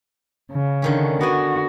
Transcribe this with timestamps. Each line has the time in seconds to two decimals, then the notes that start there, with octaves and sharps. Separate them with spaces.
0.51 C#3
0.82 D3 D#3 C#4
1.21 B3 F#4 D5 G#5